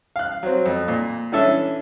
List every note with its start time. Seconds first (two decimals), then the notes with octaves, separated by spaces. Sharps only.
0.16 F5 F#6
0.43 F#3 C4
0.66 F2
0.88 A#2
1.32 E3 C#4 D4 A4 E5